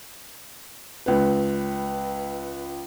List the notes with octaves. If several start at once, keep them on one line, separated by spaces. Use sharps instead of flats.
C#2 B4